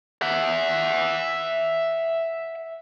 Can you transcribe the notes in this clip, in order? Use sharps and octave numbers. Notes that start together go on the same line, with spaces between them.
E5 F#5